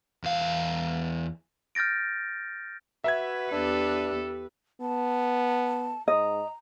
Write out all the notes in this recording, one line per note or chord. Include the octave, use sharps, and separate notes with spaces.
E2 F5
F6 G6 A6 A#6 D7
F#4 B4 E5 G#6
E2 D4 G4 A4
B3 A5
G#2 D#5 A#5